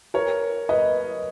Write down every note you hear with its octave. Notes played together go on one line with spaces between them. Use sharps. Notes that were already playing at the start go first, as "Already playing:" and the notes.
A#4 C#5
B4 D#5